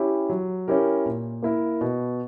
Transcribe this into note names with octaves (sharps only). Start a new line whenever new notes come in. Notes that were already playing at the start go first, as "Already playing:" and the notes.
Already playing: C#4 E4 G4
F#3
C#4 E4 G4 A#4
A#2
A#3 E4 A#4
B2